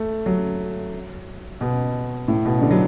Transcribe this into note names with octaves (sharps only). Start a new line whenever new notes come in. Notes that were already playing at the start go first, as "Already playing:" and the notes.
Already playing: A3
F#3
B2
A2
B2
D3
F#3